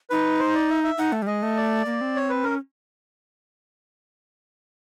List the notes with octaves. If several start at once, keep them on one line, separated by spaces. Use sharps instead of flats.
D#4 B4
C5
D5
E5
E5
D#4 F#5
A3
G3
G#3 D#5
A3
D5
A#3
C4
C#5
B4
C#4 A#4